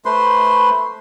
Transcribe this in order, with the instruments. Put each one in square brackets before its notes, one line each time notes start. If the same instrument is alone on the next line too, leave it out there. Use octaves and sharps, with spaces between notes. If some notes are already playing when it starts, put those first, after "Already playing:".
[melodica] A3 B4 C5 C6